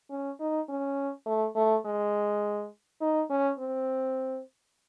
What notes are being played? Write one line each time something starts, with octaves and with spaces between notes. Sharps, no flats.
C#4
D#4
C#4
A3
A3
G#3
D#4
C#4
C4